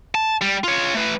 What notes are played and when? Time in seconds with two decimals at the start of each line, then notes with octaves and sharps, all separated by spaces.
0.15 A5
0.41 G3
0.64 F4 C#5
0.94 A3 B4